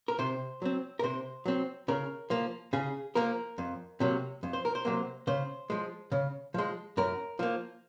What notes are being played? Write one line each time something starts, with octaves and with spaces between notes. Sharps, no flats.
A#4
C3 C5
F#3 C4
A#4
C3 C5
F#3 C4
C#3 A#4
F3 A#3
C#3 G#4
F3 A#3 A#4
F2
C3 F#3 A#3
F2
C5
A#4
C5
C3 F#3 A#3
C#3 C5
F3 G#3
C#3
F3 G#3
F#2 A#4
F3 A#3